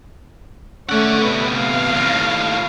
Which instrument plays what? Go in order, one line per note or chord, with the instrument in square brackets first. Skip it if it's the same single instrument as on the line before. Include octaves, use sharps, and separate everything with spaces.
[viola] A3 C#4 [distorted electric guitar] D5 F#5
[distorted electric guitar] C3 B3 [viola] B4
[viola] F5
[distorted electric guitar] D#2 A2